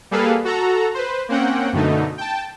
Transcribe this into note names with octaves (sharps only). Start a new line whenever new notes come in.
G3 A#3 G#4 A4 B4 F5
F#4 A4 A#5
B4 C5
A#3 C4 C#4 F#5 G5
F#2 B2 D3 A3 D#4
G5 A5